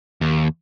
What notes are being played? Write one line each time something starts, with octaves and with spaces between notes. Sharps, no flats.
D#2